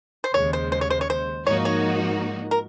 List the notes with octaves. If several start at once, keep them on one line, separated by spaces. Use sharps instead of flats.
C5
D#2 C#3 G#3 C#5
C5
C5
C#5
C5
C#5
C5
G#2 F3 A#3 D#4 F#4 C#5
C#5
A#4